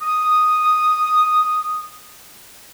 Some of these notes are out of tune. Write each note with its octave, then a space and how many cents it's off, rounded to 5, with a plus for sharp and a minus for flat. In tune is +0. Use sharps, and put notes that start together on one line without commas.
D#6 -5